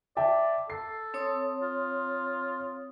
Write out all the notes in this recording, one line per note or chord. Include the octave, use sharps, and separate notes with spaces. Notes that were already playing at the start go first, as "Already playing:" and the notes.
D5 E5 G5 A5
A4 C7
C4 C#5 D#6
F4